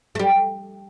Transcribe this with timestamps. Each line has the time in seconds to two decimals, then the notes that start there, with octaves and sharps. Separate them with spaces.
0.15 A3
0.19 G3